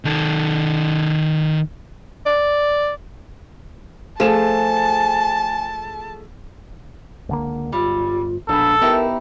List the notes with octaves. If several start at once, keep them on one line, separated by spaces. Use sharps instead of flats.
D#3 A4
D5
F3 A3 G#4 G#5 A5 E7
C#2 D3 A#3
G1 F#3 G3 F4
A#1 G#2 B2 D4 A4
B3 D#4 E4 G4 A#4